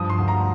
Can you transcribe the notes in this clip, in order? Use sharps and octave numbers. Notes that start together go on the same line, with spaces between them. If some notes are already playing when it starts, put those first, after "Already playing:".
Already playing: G2 F3 D#6
C6
D2
A#5